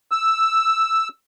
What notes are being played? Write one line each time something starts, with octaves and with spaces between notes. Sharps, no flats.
E6